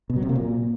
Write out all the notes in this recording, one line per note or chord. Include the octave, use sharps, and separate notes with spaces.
B2
F#3
C3
A#3
A#2